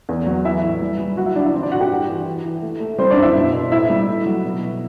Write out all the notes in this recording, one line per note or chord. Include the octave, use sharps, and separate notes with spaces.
E2
F#3
E3 E4 E5
A2
G3
G3
F#3 F#4 F#5
E4 E5
D3 D4 D5
E4 E5
E3 C4 C5
D4 D5
A2 F#4 F#5
G4 G5
G2
E3
E3
E3
A3
A3
G3 C4 C5
D4 D5
F#2
E4 E5
B2
B2
A2 E4 E5
G3
A3
F#3
B2
B2